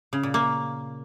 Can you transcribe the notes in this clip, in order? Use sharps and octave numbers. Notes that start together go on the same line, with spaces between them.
C#3
A#2
A#3